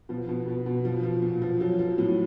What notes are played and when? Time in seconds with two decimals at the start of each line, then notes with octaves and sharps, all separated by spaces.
0.09 B2 F3
0.29 B2
0.47 B2
0.66 B2
0.85 F3
1.03 F3
1.22 A#2
1.42 F3
1.60 F3 F#3
1.79 F3
1.98 A2 F#3